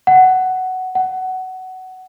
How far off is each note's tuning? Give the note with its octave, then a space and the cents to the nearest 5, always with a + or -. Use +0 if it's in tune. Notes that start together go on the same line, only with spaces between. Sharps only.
F#5 +10
F#5 +15